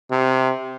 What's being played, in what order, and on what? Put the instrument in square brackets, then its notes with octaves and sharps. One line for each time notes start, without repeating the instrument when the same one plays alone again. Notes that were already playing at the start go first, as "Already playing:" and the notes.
[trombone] C3